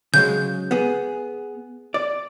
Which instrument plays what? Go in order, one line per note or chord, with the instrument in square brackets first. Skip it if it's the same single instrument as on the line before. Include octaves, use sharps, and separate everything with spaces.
[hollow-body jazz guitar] C#3 F#3 G#3 [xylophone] G6
[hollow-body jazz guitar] B3 G#4
D5